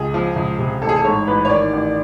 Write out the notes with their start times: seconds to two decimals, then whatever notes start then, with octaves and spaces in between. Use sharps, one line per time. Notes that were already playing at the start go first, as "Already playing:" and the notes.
Already playing: C#2 G#4
0.14 F3
0.36 C#2
0.59 C3
0.82 A1 A4
0.89 G#4
0.96 A4
1.04 G#2 C#5
1.27 A1 B4
1.45 C#5
1.49 D#3 D5
1.73 A1